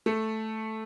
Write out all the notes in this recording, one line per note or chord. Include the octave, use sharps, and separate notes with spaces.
A3 A4